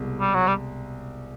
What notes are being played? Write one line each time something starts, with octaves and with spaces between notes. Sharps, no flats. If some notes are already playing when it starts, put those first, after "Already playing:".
Already playing: C2 B2 G#3
G3
F#3
G3